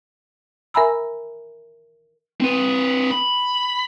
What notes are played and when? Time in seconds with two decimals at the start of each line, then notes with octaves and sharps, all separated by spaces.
0.74 A#4 E5 G#5 A#5 B5 E6
2.40 C4 B4
3.11 B5